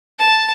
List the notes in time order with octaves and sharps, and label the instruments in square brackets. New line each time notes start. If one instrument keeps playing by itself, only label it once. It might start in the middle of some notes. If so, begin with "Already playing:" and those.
[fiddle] A5